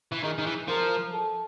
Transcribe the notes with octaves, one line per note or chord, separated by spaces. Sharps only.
E3
D#3 G#4
D#3
E3
F3 A#4
A4